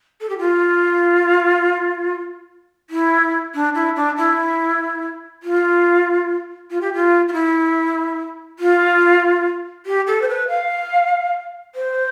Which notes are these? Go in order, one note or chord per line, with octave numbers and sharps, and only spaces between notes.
A4
G4
F4
E4
D4
E4
D4
E4
F4
F4
G4
F4
F4
E4
F4
G4
A4
C5
B4
F5
C5